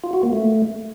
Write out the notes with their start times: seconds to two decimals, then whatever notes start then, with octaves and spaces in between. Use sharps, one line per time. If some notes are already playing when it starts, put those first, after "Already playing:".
0.04 F4
0.13 F#4
0.23 A#3
0.33 A3